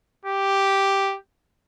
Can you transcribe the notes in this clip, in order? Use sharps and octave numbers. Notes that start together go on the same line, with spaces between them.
G4